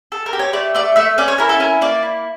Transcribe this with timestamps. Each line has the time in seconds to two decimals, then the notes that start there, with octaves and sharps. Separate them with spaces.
0.12 A4
0.26 A#4
0.33 G4
0.39 C#5
0.53 A3 D5
0.75 A3 D5
0.96 A3 E5
1.18 C#4 D5
1.28 C#5
1.38 E4 A#4
1.49 A4
1.60 C#4 A#4
1.81 A#3 D5
2.03 E4